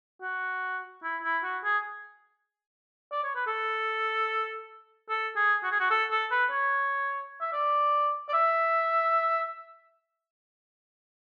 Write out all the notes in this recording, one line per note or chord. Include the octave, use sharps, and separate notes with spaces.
F#4
E4
E4
F#4
G#4
D5
C#5
B4
A4
A4
G#4
F#4
G#4
F#4
A4
A4
B4
C#5
E5
D5
D5
E5